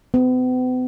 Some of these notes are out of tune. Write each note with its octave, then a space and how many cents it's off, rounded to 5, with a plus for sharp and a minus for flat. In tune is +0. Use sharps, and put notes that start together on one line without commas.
B3 +45